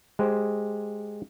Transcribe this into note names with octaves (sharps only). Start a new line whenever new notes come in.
G#3 G4 C5